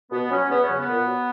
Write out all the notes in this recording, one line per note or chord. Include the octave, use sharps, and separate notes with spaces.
B2 B3
F#3 C#4
E2 B3
C#4
C#3 F#3
B3
A#2
F#3